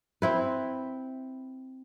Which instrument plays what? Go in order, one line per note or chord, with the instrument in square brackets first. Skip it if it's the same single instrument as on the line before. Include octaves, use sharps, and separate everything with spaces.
[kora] C4 E4 B4